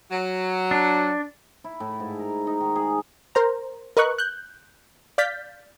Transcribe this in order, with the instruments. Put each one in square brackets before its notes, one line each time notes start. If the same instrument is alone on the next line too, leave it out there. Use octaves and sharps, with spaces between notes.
[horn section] F#3
[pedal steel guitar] D4
[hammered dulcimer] E4
A2
G#2
A#4
D#4
D#3
G#4
[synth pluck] A#4 C5 A#5
A#4 B4 D#5 C#6 F#6
F#6 G6
D5 F5 F6 G6 A6 B6